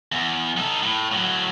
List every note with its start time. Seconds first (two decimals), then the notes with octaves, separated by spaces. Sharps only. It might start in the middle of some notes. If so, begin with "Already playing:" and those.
0.12 E2
0.58 D#4 A4
0.83 A2
1.12 A2 F#3